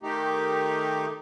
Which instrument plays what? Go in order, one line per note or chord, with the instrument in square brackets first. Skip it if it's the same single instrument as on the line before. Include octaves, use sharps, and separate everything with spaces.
[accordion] D#3 A3 D#4 G4